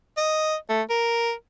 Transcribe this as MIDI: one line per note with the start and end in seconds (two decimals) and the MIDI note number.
0.17 0.55 75
0.69 0.82 57
0.90 1.32 70